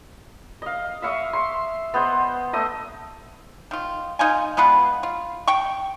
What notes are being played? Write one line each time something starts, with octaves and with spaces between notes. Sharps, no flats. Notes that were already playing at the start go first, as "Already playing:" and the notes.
D#5 F5
E5 F5 C#6 D#6
C6
B3 C5 D#5
A3 D#5 D#6
D#3 F4
D#4 F4 G#5
G#3 B3 F4 B4
F4
G5 C#6